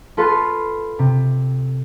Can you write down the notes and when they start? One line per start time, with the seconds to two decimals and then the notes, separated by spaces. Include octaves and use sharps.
0.17 F4 A4 B4 F5 C6
0.99 C3